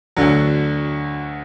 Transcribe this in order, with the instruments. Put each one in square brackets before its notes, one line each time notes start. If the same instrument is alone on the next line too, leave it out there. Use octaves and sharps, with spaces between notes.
[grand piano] D2 D3 F#3